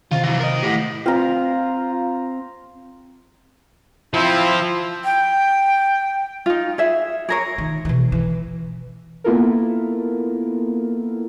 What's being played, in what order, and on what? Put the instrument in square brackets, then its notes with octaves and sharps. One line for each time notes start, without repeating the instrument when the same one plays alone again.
[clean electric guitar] C3 D#3 [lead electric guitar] F4
[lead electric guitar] E3 F#3
A#4 D#5
[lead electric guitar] A2 [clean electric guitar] G4 F#5
[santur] C4 A#5 [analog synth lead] F4
[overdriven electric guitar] F3 [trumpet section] C4 E4
[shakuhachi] G5
[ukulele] D#4 F4
G#4 E5
G#4 A#4 C#5
[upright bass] D#3
B2 E3
E3
[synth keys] A#3 B3 E4 F4 A4 A#4